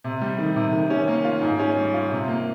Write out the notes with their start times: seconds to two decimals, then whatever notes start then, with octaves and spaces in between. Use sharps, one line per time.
0.04 C3
0.21 G3
0.39 D#3
0.56 C3
0.73 D#3
0.90 C#4
1.08 A#3
1.25 F4
1.42 G#2
1.59 C#4
1.77 G3
1.94 F4
2.11 C3
2.28 A#3